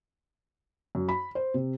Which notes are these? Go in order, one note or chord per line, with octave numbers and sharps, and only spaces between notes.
F#2
B5
C5
C3